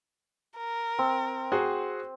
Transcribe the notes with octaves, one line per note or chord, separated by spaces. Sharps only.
A#4
C4
F#4 G#4 C5